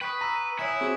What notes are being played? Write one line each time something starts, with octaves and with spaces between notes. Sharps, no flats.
B4 G5 C#6 D#6 F#6 B6 C#7
A#5 E6 D#7
E4 C#5 E5 G#5 D#6 C#7 E7
C4 F#4 G#4 C#6 G#6 B6